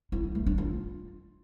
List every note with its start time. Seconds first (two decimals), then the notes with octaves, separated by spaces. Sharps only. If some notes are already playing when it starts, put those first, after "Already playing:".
0.12 E4
0.24 D#4
0.35 A3
0.46 D4
0.58 F4